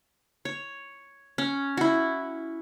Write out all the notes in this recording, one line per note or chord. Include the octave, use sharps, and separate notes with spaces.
C#5
C#4
E4 F#4